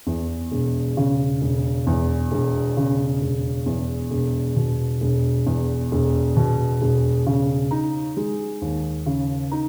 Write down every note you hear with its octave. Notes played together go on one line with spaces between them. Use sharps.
E2
E1
C#3
E1
E2
E1
C#3
E1
E2
E1
B2
E1
E2
E1
B2
E1
C#3
D#4
G#3
D#2
C#3
D#4